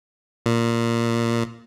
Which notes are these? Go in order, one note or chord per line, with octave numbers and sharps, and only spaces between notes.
A#2